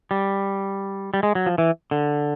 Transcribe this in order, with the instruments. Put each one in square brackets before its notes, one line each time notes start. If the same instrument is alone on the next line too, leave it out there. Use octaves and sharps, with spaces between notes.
[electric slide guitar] G3
G3
G#3
F#3
F3
E3
D3